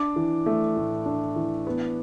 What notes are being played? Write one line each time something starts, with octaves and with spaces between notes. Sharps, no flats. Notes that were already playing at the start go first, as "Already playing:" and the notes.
Already playing: D4 D6
E3
A3
A2
D4
E3
B3